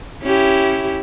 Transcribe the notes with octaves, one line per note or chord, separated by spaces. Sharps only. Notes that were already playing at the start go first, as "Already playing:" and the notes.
C#4 E4 G4